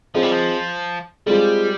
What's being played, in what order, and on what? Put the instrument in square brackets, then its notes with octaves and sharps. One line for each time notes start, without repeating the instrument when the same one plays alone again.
[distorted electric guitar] F3 [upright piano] C4 F4 G#4 D#5
[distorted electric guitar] G3
F3
[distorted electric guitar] G3 [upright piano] G#3 C4 F4 G#4